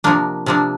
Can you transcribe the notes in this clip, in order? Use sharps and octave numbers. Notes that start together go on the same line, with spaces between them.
C3 F3 A#3 D4
C3 F3 A#3 D4